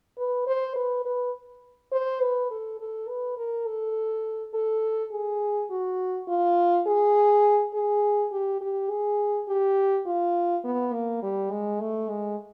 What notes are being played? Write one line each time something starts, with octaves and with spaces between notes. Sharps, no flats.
B4
C5
B4
B4
C5
B4
A4
A4
B4
A#4
A4
A4
G#4
F#4
F4
G#4
G#4
G4
G4
G#4
G4
F4
B3
A#3
G3
G#3
A3
G#3